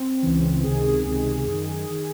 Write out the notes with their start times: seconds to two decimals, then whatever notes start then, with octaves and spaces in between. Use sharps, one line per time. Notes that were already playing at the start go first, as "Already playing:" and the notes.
Already playing: C4
0.22 C#2 C#3 E3
0.64 C#2 C3 D#3 G#4
1.06 C#2 C3 D#3
1.47 F#2 D#3
1.90 D#3